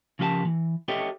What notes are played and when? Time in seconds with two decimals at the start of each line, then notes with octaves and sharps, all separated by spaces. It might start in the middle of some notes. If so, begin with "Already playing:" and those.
0.19 C#3 F3 A#3 G4 E5 A5
0.45 E3
0.88 G4 A4 C#5 D#5 E5 G5